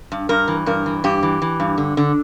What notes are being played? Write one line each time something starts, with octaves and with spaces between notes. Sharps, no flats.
G2
G2 A#4
E3
G2 A#4
E3
G2 G4
E3
E3
G2
D3
D3